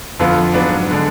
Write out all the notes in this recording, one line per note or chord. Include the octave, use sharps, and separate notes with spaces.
F2 D3 F3 B3 F4
G#2 F#3 B3 D4
D3 G#3 D4